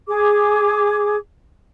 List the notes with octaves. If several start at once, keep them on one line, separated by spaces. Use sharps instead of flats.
G#4 D6